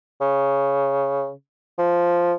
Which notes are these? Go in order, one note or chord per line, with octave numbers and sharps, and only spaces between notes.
C#3
F3